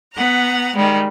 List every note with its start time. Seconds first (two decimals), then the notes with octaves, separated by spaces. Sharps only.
0.13 B3 F#5 A#5
0.74 D#3 G3 G#3